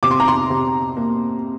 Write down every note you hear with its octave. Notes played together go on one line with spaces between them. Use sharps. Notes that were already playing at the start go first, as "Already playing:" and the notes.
C3 D6
C6
A#5
C6
C3
A#3